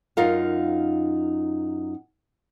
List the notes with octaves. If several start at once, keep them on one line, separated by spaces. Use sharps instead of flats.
F#2 D#4 F4 A#4 F5